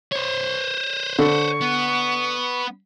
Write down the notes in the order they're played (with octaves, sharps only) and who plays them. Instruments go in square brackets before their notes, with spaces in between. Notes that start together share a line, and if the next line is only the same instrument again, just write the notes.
[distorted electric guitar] C5 C#5
[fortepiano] D3 [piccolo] C#6
[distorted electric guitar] B3